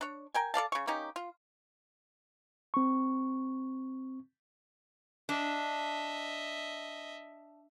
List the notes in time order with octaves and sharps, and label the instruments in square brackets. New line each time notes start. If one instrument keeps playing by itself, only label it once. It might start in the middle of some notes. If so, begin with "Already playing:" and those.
[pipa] D4 C#5
A#4 G5 G#5
A4 D5 F5 A5
C#3 C#6
A#3 C#4 D#4 G4
F4
[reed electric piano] C4 C#6
[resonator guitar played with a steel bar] D4 [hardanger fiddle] D#5 E5